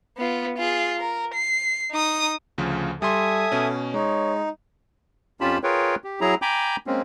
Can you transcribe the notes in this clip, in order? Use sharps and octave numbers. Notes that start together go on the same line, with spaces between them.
B3 F4
F4 G#4
A#4
C7
D#4 D#6
D2 C#3 F3
G3 A4 E5 G#5 C6 D#6
B2 C#4
G#3 D#4 C#5
F2 C#4 F4 G4 A5 B5
F4 G#4 A#4 B4 C#5 G5
G4
F#3 E4 G#4 A#5
G5 G#5 A#5 B5 D6 G6
G#3 A#3 C4 C#4